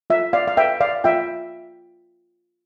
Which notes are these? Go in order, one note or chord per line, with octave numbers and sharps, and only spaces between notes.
F4 E5
D5 F5
F5
B4 E5 G5
D5 F5
F4 E5 G5